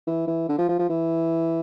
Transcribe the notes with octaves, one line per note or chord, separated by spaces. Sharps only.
E3
E3
D3
F3
F3
F3
E3